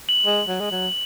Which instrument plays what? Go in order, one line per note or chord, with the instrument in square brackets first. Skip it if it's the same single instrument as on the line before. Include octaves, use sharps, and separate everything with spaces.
[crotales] F#7
[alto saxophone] G#3
F#3
G#3
F#3